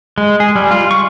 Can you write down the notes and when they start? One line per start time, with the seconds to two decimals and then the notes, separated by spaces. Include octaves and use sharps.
0.18 G#3
0.40 G#4
0.56 G3
0.71 F4
0.91 C#6